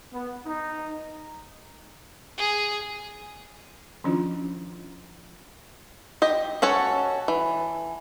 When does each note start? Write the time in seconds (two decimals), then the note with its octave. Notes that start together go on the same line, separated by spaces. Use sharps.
0.13 B3
0.46 D#4
2.38 G#4
4.04 D#3 F3 C#4 D4 E4 F4
6.22 G4 D#5
6.62 C#4 F#4 A4 C#5
7.28 E3